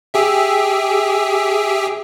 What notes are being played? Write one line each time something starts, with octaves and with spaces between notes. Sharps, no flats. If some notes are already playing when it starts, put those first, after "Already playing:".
G4 G#4 E5